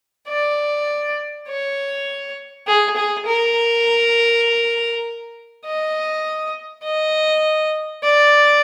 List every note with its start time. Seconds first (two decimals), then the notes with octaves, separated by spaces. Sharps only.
0.28 D5
1.49 C#5
2.67 G#4
2.96 G#4
3.26 A#4
5.65 D#5
6.84 D#5
8.04 D5